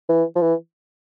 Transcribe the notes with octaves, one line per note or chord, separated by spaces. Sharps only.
E3
F3
E3